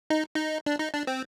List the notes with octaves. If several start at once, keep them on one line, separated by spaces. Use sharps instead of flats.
D#4
D#4
D4
D#4
D4
C4